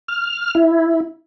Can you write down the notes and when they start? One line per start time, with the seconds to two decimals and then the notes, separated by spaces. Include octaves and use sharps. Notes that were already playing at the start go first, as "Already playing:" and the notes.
0.08 F6
0.55 E4